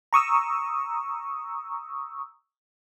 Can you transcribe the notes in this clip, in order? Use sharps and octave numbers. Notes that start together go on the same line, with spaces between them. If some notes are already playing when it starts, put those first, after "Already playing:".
A#5 C#6 D#6 E6